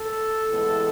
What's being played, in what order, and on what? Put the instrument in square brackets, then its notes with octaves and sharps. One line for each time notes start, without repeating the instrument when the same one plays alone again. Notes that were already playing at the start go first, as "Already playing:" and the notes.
Already playing: [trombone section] A4
A2 E3 G#3 B3